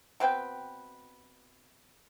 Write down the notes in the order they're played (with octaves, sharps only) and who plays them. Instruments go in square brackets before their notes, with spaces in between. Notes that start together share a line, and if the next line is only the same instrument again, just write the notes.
[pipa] B2 C4 B4 G5